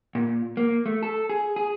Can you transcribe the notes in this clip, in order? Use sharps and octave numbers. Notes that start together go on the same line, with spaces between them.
A#2
A#3
A3
A4
G#4
G#4